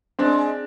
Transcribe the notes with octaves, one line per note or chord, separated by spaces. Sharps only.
G#3 C4 D4